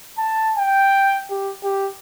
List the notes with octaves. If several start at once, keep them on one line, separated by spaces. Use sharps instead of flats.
A5
G5
G4
G4